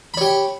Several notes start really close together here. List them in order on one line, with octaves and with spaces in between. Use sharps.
B5 C#5 G4